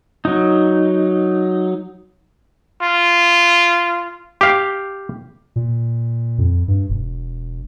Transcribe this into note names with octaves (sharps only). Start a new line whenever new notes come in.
F#3 D#4
F4
G4 F5 G5
A#2
F2
G2
E1